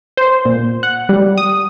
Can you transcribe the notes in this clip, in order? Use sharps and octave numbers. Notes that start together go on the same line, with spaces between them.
C5
A#2
F#5
G3
D#6